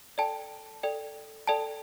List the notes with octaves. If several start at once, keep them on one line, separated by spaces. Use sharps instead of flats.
A4 D5 G5 A5
A4 D5 G5
A4 D5 G5 A5